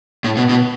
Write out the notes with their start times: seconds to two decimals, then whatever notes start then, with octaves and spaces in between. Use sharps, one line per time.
0.24 A2
0.37 B2
0.49 B2